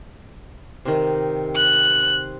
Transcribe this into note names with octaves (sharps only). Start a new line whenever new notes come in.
C3 D#3
F#6